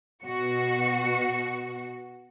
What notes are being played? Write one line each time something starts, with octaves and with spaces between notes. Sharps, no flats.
B2 F#4 C#7